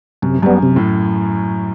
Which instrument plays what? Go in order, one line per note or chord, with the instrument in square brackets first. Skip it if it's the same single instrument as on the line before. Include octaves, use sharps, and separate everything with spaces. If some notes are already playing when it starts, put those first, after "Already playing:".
[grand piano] F#2 [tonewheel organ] C3
[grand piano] F#2 [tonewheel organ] G3 B3
[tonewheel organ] C3
[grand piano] A2